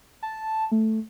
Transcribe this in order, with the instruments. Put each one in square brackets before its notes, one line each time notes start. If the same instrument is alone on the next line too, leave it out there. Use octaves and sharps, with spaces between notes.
[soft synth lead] A5
A3